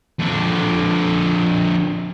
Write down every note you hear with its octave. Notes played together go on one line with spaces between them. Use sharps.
F2 D3